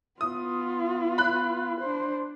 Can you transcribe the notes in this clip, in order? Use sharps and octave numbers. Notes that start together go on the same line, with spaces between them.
B3 F4 D#6
B5 F#6
D4 C5